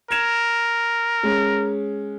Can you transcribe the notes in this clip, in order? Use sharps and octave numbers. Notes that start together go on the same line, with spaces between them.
A#4 G#6 E7 F7
G#3 C#4